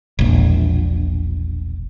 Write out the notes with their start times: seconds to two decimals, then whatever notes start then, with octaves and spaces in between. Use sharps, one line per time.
0.19 E1 A#1